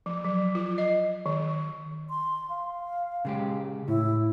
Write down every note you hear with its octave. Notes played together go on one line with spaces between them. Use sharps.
F3
F#3
F4
D#5
D#3
C6
F5
C#3 G#3 G4
A2 E4